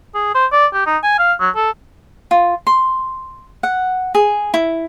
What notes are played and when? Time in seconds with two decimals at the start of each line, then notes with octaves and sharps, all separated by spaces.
0.15 G#4
0.35 C5
0.52 D5
0.74 G4
0.86 D#4
1.03 G#5
1.19 F5
1.41 F#3
1.56 A4
2.31 F4
2.67 C6
3.63 F#5
4.15 G#4
4.54 E4